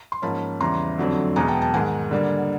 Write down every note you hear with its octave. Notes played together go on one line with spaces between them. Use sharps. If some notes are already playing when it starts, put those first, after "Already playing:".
C6
G#2 F3 A#3 C#4 A5 B5
E2 C#3 E3 G3 A#5 C6
F2 D3 F#3 A3 C4
E2 B2 G#3 B3 G#5 A#5
G5 A5
G5 A5
G#2 D#3 G#3 F#5 G#5
D3 G3 A#3